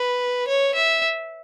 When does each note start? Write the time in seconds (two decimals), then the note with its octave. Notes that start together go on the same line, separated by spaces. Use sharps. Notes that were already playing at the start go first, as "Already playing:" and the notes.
Already playing: B4
0.47 C#5
0.74 E5